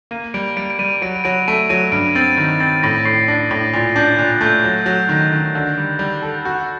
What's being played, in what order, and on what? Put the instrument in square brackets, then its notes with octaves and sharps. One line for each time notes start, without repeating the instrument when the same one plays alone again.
[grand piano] A#3 [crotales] D#7
[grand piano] G3 [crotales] D7
[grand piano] G3 [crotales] D7
[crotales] D7
[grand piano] G3 [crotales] D#7
[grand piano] F#3 [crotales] D7
[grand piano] F#3 [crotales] D7
[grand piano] A3 [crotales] D#7
[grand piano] F#3 [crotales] D#7
[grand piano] G2 [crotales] D7
[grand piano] C4 [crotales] A6
[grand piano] D#3
[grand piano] C4 [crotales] A6
[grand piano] A2 [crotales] A#6
[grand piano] A2 [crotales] C7
[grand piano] D4 [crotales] A#6
[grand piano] A2 [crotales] A#6
[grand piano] A#2 [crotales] A6
[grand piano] D4 [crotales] G6
[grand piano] A#2 [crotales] F#6
[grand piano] A3 [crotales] G6
[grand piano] F#3 [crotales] A6
[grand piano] F#3
D#3
D#3
D3
G3
G3
A4
F#4